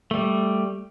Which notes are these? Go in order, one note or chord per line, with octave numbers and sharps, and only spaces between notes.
G3 A3